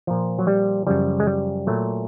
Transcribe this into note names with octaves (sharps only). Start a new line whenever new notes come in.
A#2 F3
F#3
G3
F#2 C#3 F3 G3
G#3
G3
A#2 F#3 A3